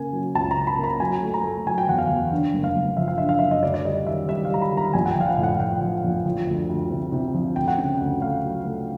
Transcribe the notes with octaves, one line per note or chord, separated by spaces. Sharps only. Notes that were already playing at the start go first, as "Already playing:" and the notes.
Already playing: C#3 A#3 G#5
F#3
C#2 A5
A#5
C#3
B5
A#3
A#5
F#3 G#5
A3
A#5
A3
F#3 G#5
G5
E2 F#5
F5
E2
D3
F#1
F5
F#1
F3 E5
F5
D3 E5
F5
F#2 E5
D#5
D2 D5
D5
G3 D#5
D#3 E5
G3 E5
F5
G3 A#5
B5
D#3
A#5
A#1 G#5
F#5
G5
F3 F5
F#5
A2
F#5
A2 G5
F3
A#1
F3
D2
D2
C3
C3
F3
D2 G5
F#5
C#3 G5
D2
A3 F5
F#3
A3